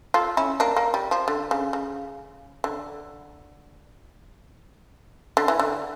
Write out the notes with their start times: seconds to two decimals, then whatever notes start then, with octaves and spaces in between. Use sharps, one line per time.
0.14 F4 A4
0.37 C#4 E4
0.60 A#3 D4
0.76 A#3
0.94 G3
1.11 F3
1.28 D3
1.51 C#3
1.73 C#3
2.64 D3
5.37 D3
5.48 E3
5.59 D3